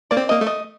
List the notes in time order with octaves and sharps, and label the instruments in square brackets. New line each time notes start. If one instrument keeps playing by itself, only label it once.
[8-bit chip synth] A#3 [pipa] D5
[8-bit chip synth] C4
[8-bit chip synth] A#3 [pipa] D#5
[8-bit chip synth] A3
[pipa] D#5